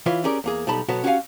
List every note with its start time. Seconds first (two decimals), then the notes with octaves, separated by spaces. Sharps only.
0.06 E3 F4 B4 C#5
0.24 C#4 G4 G#4 A#4 D5
0.44 E2 A#3 G#4
0.67 B1 G3 D#4 A5 B5
0.88 B2 F#3 B3 F#4 A4 C#5
1.04 C#4 F#4 G4 D5 F5 G#5